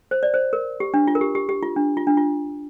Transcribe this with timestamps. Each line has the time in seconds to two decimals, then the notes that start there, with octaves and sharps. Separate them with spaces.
0.11 C5
0.23 D5
0.34 C5
0.53 A#4
0.80 G4
0.94 D4
1.07 F4
1.15 A#4
1.21 G4
1.35 G4
1.49 G4
1.63 F4
1.76 D4
1.97 F4
2.07 D4
2.17 F4